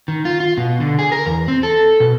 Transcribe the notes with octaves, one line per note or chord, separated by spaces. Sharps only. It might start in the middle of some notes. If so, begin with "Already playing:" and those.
D#3
F4
F4
B2
D3
G#4
A#4
E2
C4
A4
B2